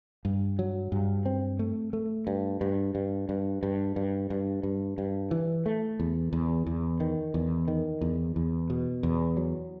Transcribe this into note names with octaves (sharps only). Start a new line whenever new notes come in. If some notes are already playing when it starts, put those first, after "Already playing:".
G2
F#3
G2
C4
A3
A3
G2
G2
G2
G2
G2
G2
G2
G2
G2
E3
A3
E2
E2
E2
D#3
E2
D#3
E2
E2
B2
E2
F#3